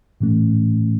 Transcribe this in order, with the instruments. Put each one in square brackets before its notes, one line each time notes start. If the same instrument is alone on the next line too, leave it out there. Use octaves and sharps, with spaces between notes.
[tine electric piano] A2 E3 A3 C#4